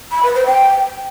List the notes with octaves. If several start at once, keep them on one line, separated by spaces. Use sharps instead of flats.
B5
B4
C5
G5